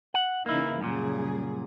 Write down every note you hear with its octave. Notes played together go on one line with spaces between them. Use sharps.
F#5
C#3 E3 A#3 D#4 E4
F#2 A#2 C#3 G3 G#4